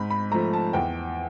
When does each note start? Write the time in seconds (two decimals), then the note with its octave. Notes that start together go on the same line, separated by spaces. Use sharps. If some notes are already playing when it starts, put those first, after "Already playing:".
Already playing: G#2 B5
0.10 B5
0.31 F3 A3 A#5
0.53 A5
0.73 E2 G5